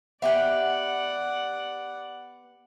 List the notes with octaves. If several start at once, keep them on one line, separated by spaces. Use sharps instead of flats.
B3 G4 D5 E5 F#5 G5